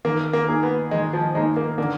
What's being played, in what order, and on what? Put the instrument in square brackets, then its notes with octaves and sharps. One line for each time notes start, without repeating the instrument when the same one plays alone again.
[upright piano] D#3 [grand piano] A#3
[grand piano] A#3
[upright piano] A#3 D#4 G#4
[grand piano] B3
[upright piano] D#3 [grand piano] G#3
[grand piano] F3
[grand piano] G#3 [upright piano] A#3 D#4 G#4
[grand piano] A#3
[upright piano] D3 [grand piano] A#3